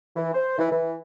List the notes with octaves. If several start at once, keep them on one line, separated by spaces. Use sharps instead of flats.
E3
C5
E3
E3